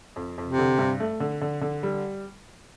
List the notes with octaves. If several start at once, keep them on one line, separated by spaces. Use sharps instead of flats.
F2
F2
C3
D3
G2
A3
D3
D3
D3
G3